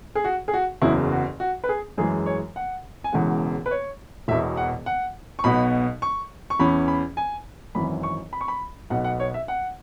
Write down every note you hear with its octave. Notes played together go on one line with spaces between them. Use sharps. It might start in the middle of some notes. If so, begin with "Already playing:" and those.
G#4
F#4
G#4
F#4
F#1 E2 C#3 F#3 E4
F#4
F#4
B4
G#4
F#2 E3 G#3 G#4
C#5
F#5
G#5
E1 E2 C#3 E3 G#3 F#5
B4
C#5
E1 E2 B2 E5
F#5
F#5
C#6
B1 B2 B3 B5
C#6
C#6
E2 E3 C#4 B5
B5
G#5
G#1 F#2 E3 B5
C#6
B5
C#6
B5
B1 B2 B3 F#5
F#5
C#5
E5
F#5